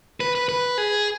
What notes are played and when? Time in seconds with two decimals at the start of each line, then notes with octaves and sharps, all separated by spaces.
0.20 B4
0.35 B4
0.49 B4
0.78 G#4